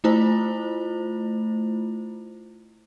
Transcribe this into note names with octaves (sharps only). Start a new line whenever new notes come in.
A3 E4 F4 C5